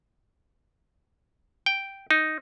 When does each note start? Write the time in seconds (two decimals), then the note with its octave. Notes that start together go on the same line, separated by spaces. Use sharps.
1.66 G5
2.11 D#4